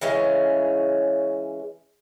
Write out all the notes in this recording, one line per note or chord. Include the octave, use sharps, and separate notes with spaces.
C#3 E3 G#3 C#4